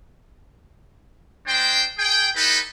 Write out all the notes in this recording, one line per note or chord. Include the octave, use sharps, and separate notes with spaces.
G#3 D4 C5 G5
G#4 G5
D#4 E4 G4 A4 B4